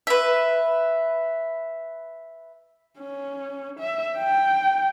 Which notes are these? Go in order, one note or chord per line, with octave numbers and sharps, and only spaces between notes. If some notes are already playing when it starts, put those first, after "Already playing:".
B4 E5
C#4
E5
G5